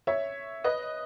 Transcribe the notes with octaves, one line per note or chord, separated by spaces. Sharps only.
C#5 E5
B4 D#5